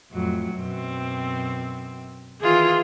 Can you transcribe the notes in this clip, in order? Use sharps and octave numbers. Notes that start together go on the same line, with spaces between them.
F2 A2 F#3
F#2 B2 C4
D#3 E3 F4 G#4